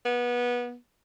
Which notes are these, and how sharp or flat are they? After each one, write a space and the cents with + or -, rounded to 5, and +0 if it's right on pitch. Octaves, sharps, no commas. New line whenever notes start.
B3 -25